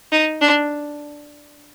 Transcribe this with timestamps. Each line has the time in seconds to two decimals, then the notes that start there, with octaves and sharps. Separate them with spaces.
0.12 D#4
0.41 D4